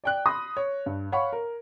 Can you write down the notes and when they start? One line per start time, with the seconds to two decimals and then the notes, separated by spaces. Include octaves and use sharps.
0.04 D5 G5 F#6
0.26 B5 C6 D#6 A#6
0.57 C#5
0.86 G2
1.12 C#5 F5 F#5 B5 C#6
1.33 A#4